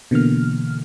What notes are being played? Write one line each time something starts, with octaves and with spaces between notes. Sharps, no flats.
B2 D3 E3 A#3 F6